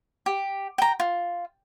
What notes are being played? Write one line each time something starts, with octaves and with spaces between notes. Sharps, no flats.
G4
G5 A#5
F4